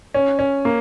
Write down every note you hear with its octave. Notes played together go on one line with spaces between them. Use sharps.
C#4
C#4
A#3